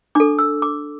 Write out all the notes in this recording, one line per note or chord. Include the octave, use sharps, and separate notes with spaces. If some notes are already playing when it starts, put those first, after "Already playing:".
D4 A4 D6
E6
D6